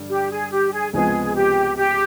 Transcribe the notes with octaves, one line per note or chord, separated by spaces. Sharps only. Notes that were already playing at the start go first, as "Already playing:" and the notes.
Already playing: G2 D3 G3
G4
G#4
G4
G#4
C#2 C3 F3 G#3 B3 G#4
G4
G4